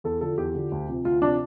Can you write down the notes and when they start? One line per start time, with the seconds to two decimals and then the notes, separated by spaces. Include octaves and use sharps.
0.04 E2 A4
0.21 D3 F3 A4
0.38 E2 G4
0.55 D3 F3
0.72 D2
0.88 C3 F3
1.05 D2 F4
1.21 C3 F3 D4